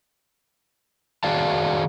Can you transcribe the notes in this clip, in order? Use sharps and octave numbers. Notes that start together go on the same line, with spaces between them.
D#3 F#4 G#4 D5 F5 A5